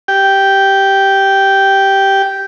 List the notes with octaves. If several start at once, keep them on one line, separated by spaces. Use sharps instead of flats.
G4 G5